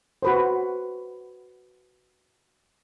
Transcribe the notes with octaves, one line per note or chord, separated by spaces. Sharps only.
F#4 B4 C5